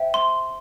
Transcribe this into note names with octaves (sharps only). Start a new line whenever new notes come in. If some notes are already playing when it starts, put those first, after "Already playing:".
Already playing: C5 E5 G5
C6